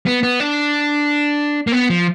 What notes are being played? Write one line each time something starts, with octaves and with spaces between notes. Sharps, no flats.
B3
B3
D4
A#3
B3
F3